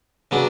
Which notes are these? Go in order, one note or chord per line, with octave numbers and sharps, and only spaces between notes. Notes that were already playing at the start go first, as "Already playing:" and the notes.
C#3 F#3 B3 D4